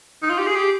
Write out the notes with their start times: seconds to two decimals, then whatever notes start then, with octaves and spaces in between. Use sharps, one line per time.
0.22 D#4
0.30 F4
0.38 G4
0.46 G#4
0.55 G4